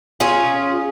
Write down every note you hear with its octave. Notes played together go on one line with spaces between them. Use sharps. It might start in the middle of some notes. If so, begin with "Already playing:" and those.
C#4 F4 G#4